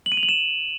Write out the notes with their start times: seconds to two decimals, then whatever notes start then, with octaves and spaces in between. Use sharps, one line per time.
0.06 F#7
0.12 D#7
0.17 F7
0.23 F#7
0.29 E7